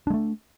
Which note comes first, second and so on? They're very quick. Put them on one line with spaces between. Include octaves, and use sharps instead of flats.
D4 G#3 A3